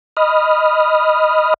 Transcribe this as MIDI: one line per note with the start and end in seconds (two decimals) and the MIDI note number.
0.17 1.54 75
0.17 1.54 83
0.17 1.54 87
0.17 1.54 89